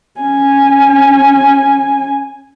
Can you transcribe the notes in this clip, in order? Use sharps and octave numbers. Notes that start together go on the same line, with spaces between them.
C#4 G#5